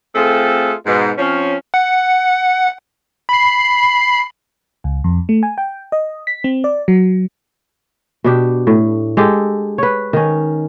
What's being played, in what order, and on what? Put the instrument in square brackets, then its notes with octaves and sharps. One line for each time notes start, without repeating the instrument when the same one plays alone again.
[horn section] A3 C4 F4 G#4 A4
G#2 B2
F3 C4 C#4
[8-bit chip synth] F#5
B5 C7
[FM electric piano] C#2
F2
A3
G#5
G5
D#5
B6
C4
D5
F#3
[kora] B2 D4 G4
A2
G#3 G4 A4
B4 C#5
D#3 C#4